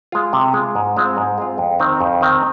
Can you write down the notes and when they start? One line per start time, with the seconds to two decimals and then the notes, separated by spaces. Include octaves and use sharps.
0.12 G#3 F4
0.33 C3
0.54 G#3 F4
0.75 G#2
0.97 G#3 C4 F4
1.17 G#2
1.38 G#3 C4 F4
1.58 F2
1.79 D#3 C4 D#4
2.00 F2
2.21 D#3 C4 D#4